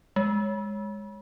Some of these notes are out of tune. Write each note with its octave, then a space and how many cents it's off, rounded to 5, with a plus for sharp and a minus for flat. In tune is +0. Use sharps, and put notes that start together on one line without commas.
G#3 -10